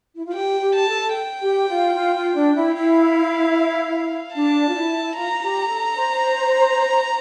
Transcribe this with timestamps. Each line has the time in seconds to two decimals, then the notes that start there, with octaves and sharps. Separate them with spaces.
0.15 E4
0.25 F4
0.34 G4 G5
0.61 G4
0.75 A5
0.88 A4
1.14 G5
1.41 G4
1.68 F4
1.94 F4
2.15 F4
2.35 D4
2.55 E4
2.74 E4 F5
4.35 D4 A5
4.68 F4
4.75 E4
5.15 F4 A#5
5.30 F4
5.42 G4
5.69 A4
5.96 C5